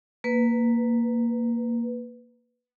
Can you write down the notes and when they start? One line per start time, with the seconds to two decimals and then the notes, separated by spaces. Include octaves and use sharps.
0.24 A#3 B4